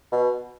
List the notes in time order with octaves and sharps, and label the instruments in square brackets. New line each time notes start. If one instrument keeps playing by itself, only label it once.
[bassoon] B2